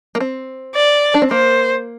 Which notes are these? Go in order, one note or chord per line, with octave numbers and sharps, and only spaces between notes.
A#3
C4
D5
D4
C4
A#3 C5